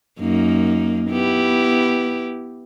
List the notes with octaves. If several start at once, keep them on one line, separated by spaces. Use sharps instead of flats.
F#2 A#3 D#4
B3 E4 G4